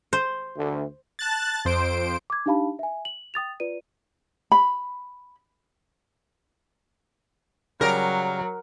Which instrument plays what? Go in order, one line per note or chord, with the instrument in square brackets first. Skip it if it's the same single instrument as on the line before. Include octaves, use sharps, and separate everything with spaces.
[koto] C5
[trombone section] D2
[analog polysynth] A5 F#6 A6
F2 C5 D7
[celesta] D6 G#6
D4 D#4 G4 F5 A5 B5
E5 G#5
F#7
G5 D#6 A6 F7
F4 B4 D5 D#7
[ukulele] B5
[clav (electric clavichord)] C#3 G3 [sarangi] F#3 [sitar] A#4